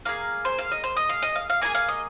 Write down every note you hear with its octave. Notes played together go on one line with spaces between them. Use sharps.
A#3 G#4 F5
C5
F5
D#5
C5
D#5
F5
D#5
F5
F5
A#3 D#4 G#4 G#5
F5
D#5